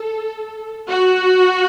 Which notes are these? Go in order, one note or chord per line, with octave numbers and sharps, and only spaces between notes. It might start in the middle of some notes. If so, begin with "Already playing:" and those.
Already playing: A4
F#4